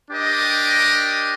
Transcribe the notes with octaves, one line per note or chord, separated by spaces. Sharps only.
D4 G4 A#4 D#5